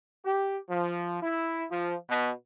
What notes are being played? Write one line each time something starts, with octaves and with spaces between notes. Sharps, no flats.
G4
F3
E4
F3
B2